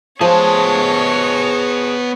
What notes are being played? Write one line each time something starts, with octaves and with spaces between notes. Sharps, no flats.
F3 B3 G#4 C#5 A5 C6